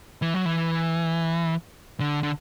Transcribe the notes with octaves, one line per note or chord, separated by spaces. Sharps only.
E3
F#3
E3
D3
D3